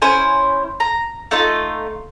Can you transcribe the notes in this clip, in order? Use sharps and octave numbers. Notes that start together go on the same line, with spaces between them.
C#4 E4 C5 G#5
A#5
A3 D#4 F4